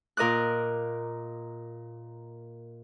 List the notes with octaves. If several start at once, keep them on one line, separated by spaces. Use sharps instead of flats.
A#2 A#4 D#5 D6 F#6